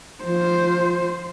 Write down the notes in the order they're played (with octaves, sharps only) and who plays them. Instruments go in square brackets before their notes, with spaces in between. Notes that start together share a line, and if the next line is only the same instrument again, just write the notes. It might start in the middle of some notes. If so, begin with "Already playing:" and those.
[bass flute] F3 [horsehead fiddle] C5